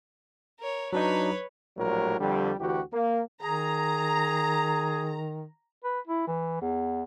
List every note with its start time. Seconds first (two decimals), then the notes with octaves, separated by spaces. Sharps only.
0.59 A#4 C#5
0.93 F#3 D4 D#4 B4 C#5
1.78 A#1 A2 F#3 G3 A#4
2.20 F2 D3 G3
2.60 D2 E3 F#4 G4
2.93 A#3
3.42 D#3 G#4 A#5
5.84 B4
6.07 E4
6.27 E3
6.61 E2